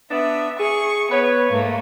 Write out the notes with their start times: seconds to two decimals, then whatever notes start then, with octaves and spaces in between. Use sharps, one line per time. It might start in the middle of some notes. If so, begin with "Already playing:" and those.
0.11 B3 D4 E5
0.59 G#4 C#6
1.11 B3 B4 C#5
1.49 G#2 A3 A#3